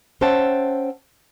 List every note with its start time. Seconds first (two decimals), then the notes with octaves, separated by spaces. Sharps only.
0.21 C#4 C5 E5 F#5 G5 A5